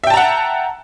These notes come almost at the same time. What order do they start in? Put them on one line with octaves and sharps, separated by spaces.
E5 G5 A5 A#5 F#5